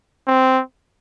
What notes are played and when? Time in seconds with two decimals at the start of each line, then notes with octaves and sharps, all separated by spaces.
0.27 C4